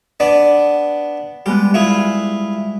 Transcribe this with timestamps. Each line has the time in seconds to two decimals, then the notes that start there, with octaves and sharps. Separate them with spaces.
0.20 B3 D4 D5
1.46 G3 G#3 B3 G4
1.74 E4 F4 G#4